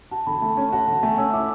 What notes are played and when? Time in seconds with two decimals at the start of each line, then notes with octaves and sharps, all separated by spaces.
0.11 F#4 A5
0.27 D3 B5
0.42 A3 A5
0.57 C#4
0.72 F#4 A5
0.88 D3 F#5
1.03 A3 G#5
1.18 C#4 E6
1.33 E4 D6